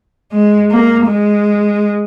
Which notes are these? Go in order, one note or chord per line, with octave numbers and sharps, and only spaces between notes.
G#3
A#3
G#3